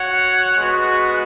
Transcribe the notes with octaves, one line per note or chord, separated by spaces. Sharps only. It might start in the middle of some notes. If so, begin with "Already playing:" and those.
Already playing: F#4 C#5 F#5
G#3 B3 F#4